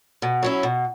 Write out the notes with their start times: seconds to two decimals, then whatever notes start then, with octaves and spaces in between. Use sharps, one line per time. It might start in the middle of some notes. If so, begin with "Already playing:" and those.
0.22 B2
0.43 F#3 C#4 E4
0.63 B2